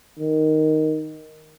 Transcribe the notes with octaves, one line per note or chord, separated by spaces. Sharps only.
D#3